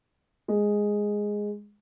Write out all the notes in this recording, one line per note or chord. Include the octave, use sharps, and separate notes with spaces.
G#3